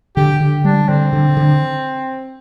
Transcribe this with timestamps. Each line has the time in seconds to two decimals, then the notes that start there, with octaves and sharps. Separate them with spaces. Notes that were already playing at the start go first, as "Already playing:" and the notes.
0.16 D3 G4
0.41 D3
0.64 G3 D4
0.89 D3 C4
1.13 D3
1.37 D3